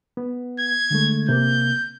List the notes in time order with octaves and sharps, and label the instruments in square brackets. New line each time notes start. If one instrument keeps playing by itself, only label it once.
[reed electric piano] B3
[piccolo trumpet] G#6
[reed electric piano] D3 G#3 A3
[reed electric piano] C3 A#3 [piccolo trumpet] G6